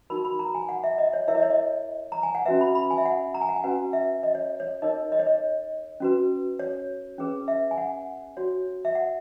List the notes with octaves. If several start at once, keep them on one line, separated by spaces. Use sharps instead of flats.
D#4 F#4 A#4 B5
B5
A#5
G#5
F#5
E5
D#5
C#5
E4 A#4 C#5 E5
D#5
C#5
D#5
A#5
G#5
F#5
C#4 F#4 B4 E5
B5
B5
G#5
E5
F#5
A#5
G#5
F#5
G#5
C#4 F#4 B4 F#5
E5
D#5
C#5
C#5
D#4 A#4 C#5 D#5
D#5
C#5
D#5
C#4 F#4 B4
C#5
C#4 G#4 B4
E5
G#5
F#5
F#4 C#5
E5
F#5